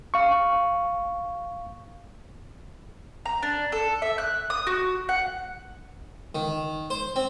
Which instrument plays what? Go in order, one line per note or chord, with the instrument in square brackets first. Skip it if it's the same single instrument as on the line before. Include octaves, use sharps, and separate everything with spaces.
[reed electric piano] F5 C#6
[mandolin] A#5
D4
A4
E5
F#6
D#6
F#4
F#5
[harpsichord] D#3
C5
C4